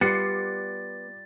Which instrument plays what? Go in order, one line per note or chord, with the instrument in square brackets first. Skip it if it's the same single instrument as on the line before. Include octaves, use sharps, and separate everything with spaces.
[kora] G3 F4 [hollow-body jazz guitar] B3 [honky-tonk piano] D6 C7 C#7 [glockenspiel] A6